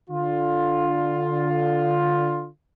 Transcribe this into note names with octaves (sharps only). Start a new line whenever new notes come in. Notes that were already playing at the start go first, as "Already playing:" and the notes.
D3 F4